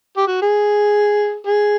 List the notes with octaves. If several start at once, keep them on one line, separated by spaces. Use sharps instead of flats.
G4
F#4
G#4
G#4